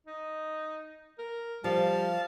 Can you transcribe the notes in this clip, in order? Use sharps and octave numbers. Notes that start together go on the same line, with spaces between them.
D#4
A#4
F3 G3 F4 F5 A5